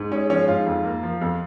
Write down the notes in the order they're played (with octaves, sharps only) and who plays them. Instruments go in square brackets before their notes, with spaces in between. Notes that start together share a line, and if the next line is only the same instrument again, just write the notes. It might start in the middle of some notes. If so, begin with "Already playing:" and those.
Already playing: [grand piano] G#2
G#3 C#4
F3 C#4
G#2 F4
F2
A#3
F3
F2